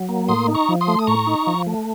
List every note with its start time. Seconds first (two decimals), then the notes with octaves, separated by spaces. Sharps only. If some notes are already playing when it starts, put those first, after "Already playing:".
Already playing: F#3
0.09 A#3
0.28 A2 C6 D#6
0.48 D#4
0.54 A#5 C#6
0.69 F3
0.81 C6 D#6
0.88 A3
0.99 D#6
1.07 A2 A#5 C#6
1.27 D#4
1.47 F3
1.67 A3